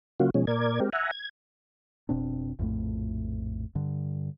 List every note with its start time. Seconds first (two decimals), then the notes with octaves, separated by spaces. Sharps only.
0.20 C#3 F#3 A#3 F4 F#4
0.34 B2 F3 G#3 C#4
0.47 A#2 A#4 D5 G#6
0.80 G#3 C4 G4 A#4
0.93 E5 F#5 G#5 A#5
1.11 G#6
2.09 F1 B2 C4 D4
2.59 A#1 F2 A2 A3
3.75 G2 D3